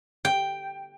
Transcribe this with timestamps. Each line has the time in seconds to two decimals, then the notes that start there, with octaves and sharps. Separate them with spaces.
0.25 G5